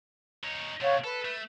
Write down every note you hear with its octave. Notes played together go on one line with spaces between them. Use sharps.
D#4 C#5
C3 A3 C#5 F5 F#5
A4 B4
A3